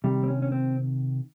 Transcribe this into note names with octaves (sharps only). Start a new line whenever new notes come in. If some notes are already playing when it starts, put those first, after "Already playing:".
C3 D#3 G3
C4
C#4
C#4
C4